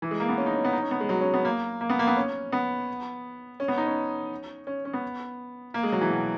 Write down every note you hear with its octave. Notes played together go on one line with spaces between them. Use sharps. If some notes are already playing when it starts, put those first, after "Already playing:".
E3
G#3
A#3
B3
C#4
D#4
C#4
B3
D#4
C#4
B3
G#3
F#3
C#4
B3
A#3
A#3
B3
A#3
B3
C#4
B3
C#4
B3
D#4
C#4
C#4
C#4
B3
A#3
G#3
F#3
E3
B2